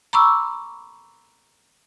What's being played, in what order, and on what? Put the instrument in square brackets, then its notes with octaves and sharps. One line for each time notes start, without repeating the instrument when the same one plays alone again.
[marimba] A#5 B5 C#6 D6 E6